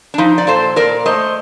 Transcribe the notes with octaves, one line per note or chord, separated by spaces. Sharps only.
D4
F3 D#4
D5
A#2 A4 C5
A#2 A#4 D5
A3 C5 D#5